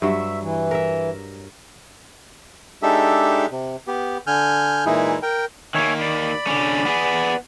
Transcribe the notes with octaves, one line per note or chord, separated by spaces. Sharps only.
G2 F#3 E5
E3
A#4 E5
G#3 D4 D#4 G4 A4 E5
C3
B3 G4
D3 G#5 F6 G6
A#2 E3 G#3 D#4 E4 G#4
A#4 G5
D#3 A#3 C#5 E5 G#5
D5 B5
D3 C#4
B3 G#4